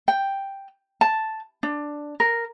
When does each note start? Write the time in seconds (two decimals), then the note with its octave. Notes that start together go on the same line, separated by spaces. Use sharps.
0.08 G5
1.01 A5
1.63 D4
2.20 A#4